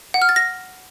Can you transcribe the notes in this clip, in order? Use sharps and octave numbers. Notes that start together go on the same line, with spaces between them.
F#5
F6
A6
A#6